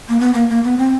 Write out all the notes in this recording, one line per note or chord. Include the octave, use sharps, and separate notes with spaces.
A#3
B3
A#3
A#3
B3
C4